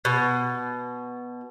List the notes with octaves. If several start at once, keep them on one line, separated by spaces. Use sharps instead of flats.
B2